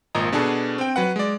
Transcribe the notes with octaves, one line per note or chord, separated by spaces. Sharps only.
G#1 A#2 D#5 A#5
B2 D4 F#4 G#4 A4 B4
C4 G5
F#3 B4 F#5
G#3 D5